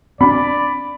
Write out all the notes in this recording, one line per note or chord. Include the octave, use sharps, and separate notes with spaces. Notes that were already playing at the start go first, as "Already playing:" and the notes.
C4 D4 D5 B5